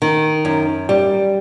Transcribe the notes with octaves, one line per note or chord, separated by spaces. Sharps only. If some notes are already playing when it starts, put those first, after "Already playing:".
D#3
F#2
G3